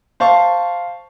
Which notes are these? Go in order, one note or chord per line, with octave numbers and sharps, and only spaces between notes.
C5 F5 A5 C#6